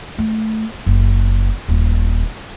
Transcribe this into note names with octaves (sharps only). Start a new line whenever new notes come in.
A3
F#1
D#1